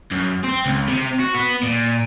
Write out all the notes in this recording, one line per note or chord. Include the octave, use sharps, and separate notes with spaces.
F#2
C4
C#2
C3
F#4
B3
A#2